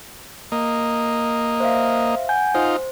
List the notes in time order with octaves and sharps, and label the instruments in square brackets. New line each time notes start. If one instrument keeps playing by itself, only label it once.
[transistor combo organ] A#3 D#5
[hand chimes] C5 E5 F5
F#5 G#5 G6
[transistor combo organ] D#4 F4 [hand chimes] C5